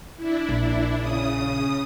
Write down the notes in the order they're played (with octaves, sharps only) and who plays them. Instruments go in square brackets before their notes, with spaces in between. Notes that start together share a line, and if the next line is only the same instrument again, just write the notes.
[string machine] D4 E4
[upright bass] A#1
[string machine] C#3 D#6